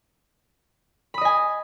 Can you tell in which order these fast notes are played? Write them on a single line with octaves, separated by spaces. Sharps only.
B5 D#6 D#5 G#5